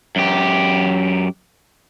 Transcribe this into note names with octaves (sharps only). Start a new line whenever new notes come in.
F#2 G4